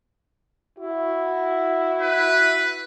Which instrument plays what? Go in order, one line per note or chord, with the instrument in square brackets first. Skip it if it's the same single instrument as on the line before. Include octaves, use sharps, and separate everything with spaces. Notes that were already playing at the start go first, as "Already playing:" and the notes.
[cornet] E4 [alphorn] F#4
[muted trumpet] B4